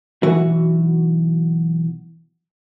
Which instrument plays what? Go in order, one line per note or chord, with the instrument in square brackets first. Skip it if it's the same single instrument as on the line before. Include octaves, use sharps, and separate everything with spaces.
[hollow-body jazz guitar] B1 E3 F#4